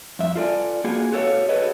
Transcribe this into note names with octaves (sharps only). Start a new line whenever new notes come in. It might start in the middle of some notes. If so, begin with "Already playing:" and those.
F2 E5
F4 A4 D5 G#5
A#3 F4 F#4 G#4 G#5
F#4 G4 A4 B4 C#5 F5
F#4 G#4 A4 B4 C#5 D#5